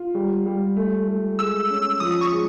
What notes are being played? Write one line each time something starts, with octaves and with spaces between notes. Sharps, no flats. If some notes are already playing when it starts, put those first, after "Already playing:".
Already playing: F4
G3
G3
A3
A3
G#3 E6
C#4
F3 D#6
C#6
G#3